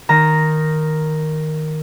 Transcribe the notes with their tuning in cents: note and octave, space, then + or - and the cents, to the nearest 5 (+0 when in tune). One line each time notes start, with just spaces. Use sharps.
D#3 +0 A#5 +0